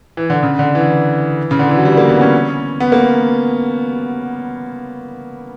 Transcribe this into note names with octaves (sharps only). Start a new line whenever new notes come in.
E3
D3
C#3
D3
E3
C#3
D3
E3
F#3
G3
A#3
B3
C#4
B3
A#3